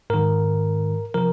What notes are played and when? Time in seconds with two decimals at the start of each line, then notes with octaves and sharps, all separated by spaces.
0.10 G#2 D#3 A#4
1.14 C3 F3 A#4